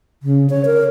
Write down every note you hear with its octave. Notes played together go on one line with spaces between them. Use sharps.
C#3
C#5
A#4